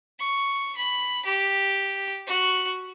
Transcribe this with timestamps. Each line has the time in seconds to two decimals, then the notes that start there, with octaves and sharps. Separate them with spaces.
0.19 C#6
0.77 B5
1.25 G4
2.27 F#4